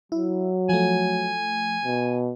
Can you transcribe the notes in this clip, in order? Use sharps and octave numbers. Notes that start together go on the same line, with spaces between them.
F#3 E4
F3 A3 G#5
B2